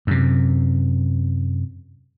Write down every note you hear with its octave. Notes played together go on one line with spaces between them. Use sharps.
F#2 C3